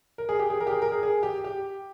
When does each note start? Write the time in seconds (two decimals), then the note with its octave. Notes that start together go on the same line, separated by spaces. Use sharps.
0.18 A#4
0.29 G#4
0.39 G4
0.50 G#4
0.61 A#4
0.67 G4
0.71 G#4
0.82 A#4
0.92 G#4
1.03 G#4
1.23 G4
1.44 G4